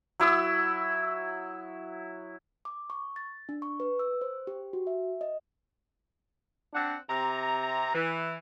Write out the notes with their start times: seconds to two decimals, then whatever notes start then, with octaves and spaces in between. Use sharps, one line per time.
0.20 F#3 E4 D#6 E6
2.65 D6
2.90 C#6
3.16 A6
3.49 D4
3.62 C#6
3.80 B4
3.99 E6
4.21 C5
4.47 G4
4.73 F#4
4.87 E5
5.21 D#5
6.74 C4 D4 F#5
7.09 C3 A#5
7.94 E3